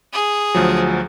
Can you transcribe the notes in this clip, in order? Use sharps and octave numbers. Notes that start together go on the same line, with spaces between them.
G#4
D2 F3 F#3